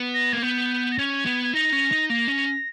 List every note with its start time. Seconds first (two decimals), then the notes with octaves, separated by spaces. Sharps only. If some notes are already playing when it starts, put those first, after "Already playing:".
Already playing: B3
0.14 A#6
0.33 A#3 G#6
0.42 B3 G6
0.92 A#6
0.98 C#4 G#6
1.26 B3
1.44 G#6
1.53 D#4 A#6
1.72 C#4
1.92 D#4
2.10 A#3 A#6
2.28 C#4